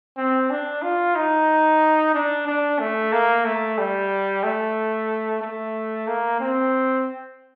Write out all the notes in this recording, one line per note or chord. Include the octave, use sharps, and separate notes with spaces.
C4
D4
F4
D#4
D4
D4
A3
A#3
A3
G3
A3
A3
A#3
C4